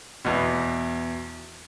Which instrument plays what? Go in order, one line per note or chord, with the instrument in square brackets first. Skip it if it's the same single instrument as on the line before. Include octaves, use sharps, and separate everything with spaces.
[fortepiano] E2 B2